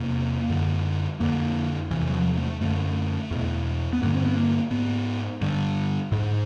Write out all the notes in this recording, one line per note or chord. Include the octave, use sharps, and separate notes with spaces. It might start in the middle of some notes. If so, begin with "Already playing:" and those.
Already playing: E2 C3 A#3
F#2 D3
F2 D3 A#3
E2 C3 E3
F#3
F3
A3
F#2 D3 A3
E2 B2
B3
G2 D3 A#3
C4
B3
A#3
G#2 B3
G2 D3
G#2